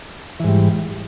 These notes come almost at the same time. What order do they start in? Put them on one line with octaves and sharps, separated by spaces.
E3 G#2 G3